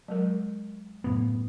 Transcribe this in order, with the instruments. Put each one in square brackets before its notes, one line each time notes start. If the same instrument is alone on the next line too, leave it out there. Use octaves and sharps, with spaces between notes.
[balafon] F#3 G#3 A#4
[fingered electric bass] F#2 A2 B3